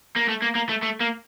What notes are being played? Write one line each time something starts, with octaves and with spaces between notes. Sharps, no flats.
A#3
A3
A#3
A#3
A3
A3
A#3